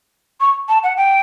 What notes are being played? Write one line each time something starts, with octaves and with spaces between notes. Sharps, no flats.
C#6
A5
F#5
G5